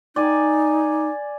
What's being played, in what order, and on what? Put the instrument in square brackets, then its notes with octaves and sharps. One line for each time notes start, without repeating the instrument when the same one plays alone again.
[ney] D#4 [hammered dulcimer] D5 G#5